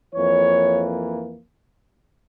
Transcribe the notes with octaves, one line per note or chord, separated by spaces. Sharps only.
F2 E3 A#3 C#5